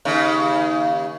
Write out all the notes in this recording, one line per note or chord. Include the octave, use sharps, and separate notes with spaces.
D#2 C#3